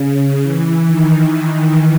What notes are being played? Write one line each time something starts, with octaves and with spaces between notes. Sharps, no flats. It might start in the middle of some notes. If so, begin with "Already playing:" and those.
Already playing: C#3
E3
D#3